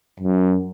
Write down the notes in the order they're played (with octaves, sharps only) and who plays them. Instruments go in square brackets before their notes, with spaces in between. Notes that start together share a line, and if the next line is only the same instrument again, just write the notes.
[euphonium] F#2